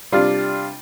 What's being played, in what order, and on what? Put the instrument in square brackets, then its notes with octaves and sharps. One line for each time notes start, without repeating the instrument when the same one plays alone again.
[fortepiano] C3 G3 D4 F4